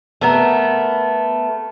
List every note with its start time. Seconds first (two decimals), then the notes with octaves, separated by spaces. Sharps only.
0.21 A3 B3 A#4